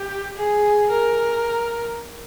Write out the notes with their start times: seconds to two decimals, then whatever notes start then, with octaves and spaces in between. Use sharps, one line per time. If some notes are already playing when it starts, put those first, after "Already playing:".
Already playing: G4
0.37 G#4
0.90 A#4